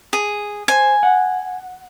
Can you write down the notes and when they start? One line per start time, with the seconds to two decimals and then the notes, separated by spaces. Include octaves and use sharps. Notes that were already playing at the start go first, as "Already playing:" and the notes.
0.13 G#4
0.68 C5 G#5
1.03 F#5